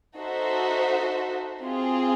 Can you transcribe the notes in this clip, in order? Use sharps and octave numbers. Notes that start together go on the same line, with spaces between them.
D#4 F#4 A4 C5 E5
C4 F4 G#4